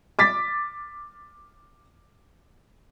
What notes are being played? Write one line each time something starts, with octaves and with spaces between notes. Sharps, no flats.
D6 A6 B6